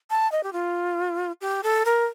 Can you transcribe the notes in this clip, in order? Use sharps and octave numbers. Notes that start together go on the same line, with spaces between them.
A5
D#5
G4
F4
G4
A4
A#4